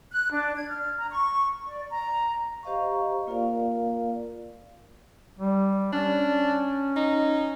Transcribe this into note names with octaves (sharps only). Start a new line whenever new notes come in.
F#6
D4
G#6
F6
A#5
C#6
D5
A#5
G4 C5 D#5 F5 A#5 C#6
A#3 F4 A#4 D5 F5
G3
C#4 D4
D#4